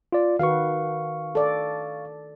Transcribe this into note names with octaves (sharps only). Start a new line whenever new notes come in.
F4 D5
D#3 F#4 B4 F5 C#6
A4 D5